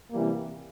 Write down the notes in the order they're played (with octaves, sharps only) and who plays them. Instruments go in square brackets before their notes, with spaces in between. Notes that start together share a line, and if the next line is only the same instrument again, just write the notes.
[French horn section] C3 E3 G3 A#3